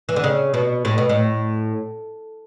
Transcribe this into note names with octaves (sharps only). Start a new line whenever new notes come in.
E3
D3
C#3
B2
A2
B2
A2